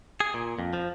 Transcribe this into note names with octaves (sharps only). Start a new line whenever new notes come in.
G#4
A#2
F2
F3